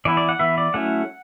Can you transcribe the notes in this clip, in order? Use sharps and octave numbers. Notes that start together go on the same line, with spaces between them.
E3 B3 E4 D5
D5
F#5
E3 B3 E4 E5
D5
F#3 A3 C#4 E4 F#5